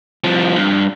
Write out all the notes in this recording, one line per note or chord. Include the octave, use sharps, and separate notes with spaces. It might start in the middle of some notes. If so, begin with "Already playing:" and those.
C2 F3
G2